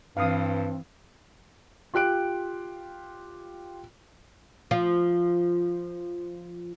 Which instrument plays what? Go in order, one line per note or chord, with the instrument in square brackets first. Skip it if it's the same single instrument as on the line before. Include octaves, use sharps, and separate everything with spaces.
[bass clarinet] G2 [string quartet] E3 [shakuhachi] C4 [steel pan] F5 D#6
[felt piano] F4 G4 F#6 D7
[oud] F3 F4